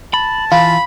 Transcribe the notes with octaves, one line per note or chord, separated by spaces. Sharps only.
A5 B5
E3 F4 B5